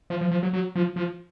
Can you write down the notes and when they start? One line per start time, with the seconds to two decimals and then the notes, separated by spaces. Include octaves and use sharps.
0.10 F3
0.21 F3
0.31 F3
0.43 F#3
0.53 F#3
0.75 F3
0.96 F3